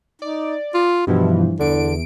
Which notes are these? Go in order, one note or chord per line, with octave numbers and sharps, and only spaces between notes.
D#4 D5
F4
G2 B2 E3 F3
E2 D3 D7